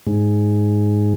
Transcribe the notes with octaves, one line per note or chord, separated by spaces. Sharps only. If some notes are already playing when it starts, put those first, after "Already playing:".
G#2